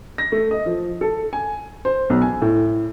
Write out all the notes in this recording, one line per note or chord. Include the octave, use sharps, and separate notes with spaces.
A#6
A3
D#5
F3
A4
G#5
C5
B1
G#5
A2